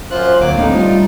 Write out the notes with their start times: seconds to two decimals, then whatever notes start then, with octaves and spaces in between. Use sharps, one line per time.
0.11 F#2 F4 C5 F#6
0.41 D1 F#3 A#3 F5 D6
0.57 A2 A3 C4 D4 D#4
0.73 G3 F4